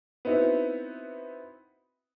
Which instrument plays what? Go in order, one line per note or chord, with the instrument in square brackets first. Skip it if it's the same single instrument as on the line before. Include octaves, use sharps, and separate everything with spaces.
[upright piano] B3 C4 D#4 E4 F#4